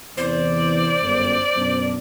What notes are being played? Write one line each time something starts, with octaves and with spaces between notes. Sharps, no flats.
E2 C3 E3 C5 D5
G1 F#2
F#2 B2 D4